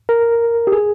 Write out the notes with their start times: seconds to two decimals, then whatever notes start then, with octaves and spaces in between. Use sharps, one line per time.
0.09 A#4
0.67 G4
0.72 G#4